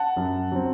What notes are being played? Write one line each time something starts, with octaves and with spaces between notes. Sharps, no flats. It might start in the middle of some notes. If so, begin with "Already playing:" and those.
Already playing: F#5 A5
F#2
F#3 C4